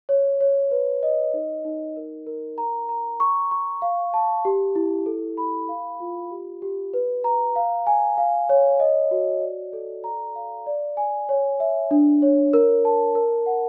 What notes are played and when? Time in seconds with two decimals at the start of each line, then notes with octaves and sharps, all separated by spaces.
0.09 C#5
0.41 C#5
0.71 B4
1.03 D#5
1.34 D#4
1.65 D#4
1.96 A#4
2.27 A#4
2.58 A#5
2.89 A#5
3.20 C#6
3.51 C#6
3.82 F5
4.14 A5
4.45 G4
4.75 E4
5.06 A4
5.37 B5
5.69 F5
6.00 F4
6.31 G4
6.62 G4
6.94 B4
7.24 A#5
7.56 F5
7.87 G#5
8.18 F5
8.49 C#5
8.80 D#5
9.11 F#4
9.42 D5
9.73 A4
10.04 A#5
10.35 F5
10.67 D5
10.97 G#5
11.29 C#5
11.60 E5
11.91 D4
12.22 C#5
12.53 A#4
12.85 A5
13.15 A#4
13.46 F#5